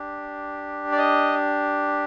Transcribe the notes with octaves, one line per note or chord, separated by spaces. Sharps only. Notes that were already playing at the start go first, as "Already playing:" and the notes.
Already playing: D4 G4
D5
D#5